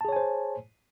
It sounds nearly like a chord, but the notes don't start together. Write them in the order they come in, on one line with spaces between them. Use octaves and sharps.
A5 G#4 C#5 G#5 C5